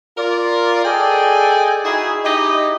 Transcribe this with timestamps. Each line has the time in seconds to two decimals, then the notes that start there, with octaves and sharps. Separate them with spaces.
0.18 F4 A#4 D5
0.85 G#4 A4 D5 D#5 G5 G#5
1.85 D#4 E4 F#4 G#4
2.25 D#4 E4 G4 D#5